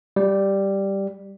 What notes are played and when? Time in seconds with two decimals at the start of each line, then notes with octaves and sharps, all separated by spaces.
0.16 G3